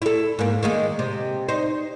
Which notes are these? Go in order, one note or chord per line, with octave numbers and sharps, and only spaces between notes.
E4 A4
G#2 A#3
D#3 G#3 A#3
C3
D#4 C5